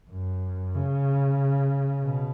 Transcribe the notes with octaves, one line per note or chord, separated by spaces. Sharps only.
F#2
C#3
B2